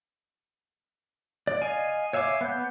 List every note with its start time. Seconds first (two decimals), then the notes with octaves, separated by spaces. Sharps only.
1.47 D5
1.62 D#5 F5 G#5
2.13 C#5 E5 F5 G#5 D6
2.41 B3 G6